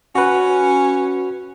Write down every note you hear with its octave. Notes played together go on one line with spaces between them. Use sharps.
C#4 F#4 B4